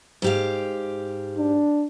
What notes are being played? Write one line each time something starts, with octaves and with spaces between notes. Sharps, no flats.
G#2 G4 F5
D4